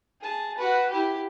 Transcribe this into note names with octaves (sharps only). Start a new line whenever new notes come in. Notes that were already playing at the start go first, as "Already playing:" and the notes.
G#4 A5
F#4 B4
E4 G4